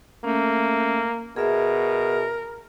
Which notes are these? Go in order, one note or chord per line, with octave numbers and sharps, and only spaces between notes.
A3 A#3 C#4
B2 G#4 A#4 E5